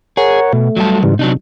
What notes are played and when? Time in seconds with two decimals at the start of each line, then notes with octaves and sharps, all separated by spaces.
0.17 G#4 A#4 C#5 F#5
0.53 B2 A3
0.77 F#3 G3 A5
1.03 G#2 C#3 E3 G3
1.19 C3 F#3 D4 D#4